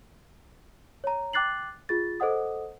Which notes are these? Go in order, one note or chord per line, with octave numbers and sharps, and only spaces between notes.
C#5 A#5
G5 D6 F#6 A6 C7 F#7
F4 G#4 A6
A4 C5 D#5 F#5 D#6